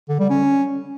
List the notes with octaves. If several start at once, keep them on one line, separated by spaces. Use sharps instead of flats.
D3
G3
C#4